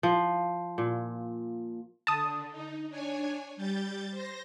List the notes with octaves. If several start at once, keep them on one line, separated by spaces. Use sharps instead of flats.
F3
A#2
D3 A5 D#6
D#4
D4 C#5 G#5
G3 G6 A6
C5 A#6